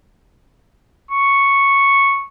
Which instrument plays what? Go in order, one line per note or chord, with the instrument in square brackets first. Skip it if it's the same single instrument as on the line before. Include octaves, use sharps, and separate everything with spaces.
[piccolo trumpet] C#6